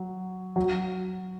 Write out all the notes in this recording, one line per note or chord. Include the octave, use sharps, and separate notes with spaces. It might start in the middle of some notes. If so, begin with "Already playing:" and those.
Already playing: F#3
F#3